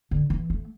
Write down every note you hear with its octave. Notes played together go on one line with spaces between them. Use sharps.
D3
E3
A3